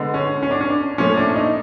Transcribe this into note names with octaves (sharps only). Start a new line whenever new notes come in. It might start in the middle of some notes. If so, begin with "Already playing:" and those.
Already playing: D3 G#3 B3
C#4
C#4
D4
C#4
D4
A#2 F3 A3 C#4
D4
D#4